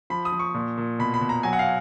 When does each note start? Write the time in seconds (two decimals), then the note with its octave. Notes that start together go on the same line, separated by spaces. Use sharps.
0.10 F3 B5
0.25 D#6
0.32 F3
0.39 C#6
0.54 A#2
0.77 A#2
0.99 B2 B5
1.14 B5
1.21 B2
1.29 A#5
1.43 F#3 G#5
1.53 F#5
1.59 F5